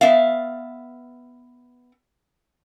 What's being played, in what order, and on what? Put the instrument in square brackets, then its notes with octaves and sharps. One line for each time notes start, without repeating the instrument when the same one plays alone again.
[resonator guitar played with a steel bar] B3 E5 F5